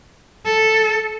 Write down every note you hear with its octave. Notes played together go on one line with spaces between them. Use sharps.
A4